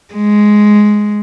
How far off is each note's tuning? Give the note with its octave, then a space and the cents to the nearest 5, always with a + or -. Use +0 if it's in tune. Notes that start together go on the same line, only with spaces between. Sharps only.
G#3 +5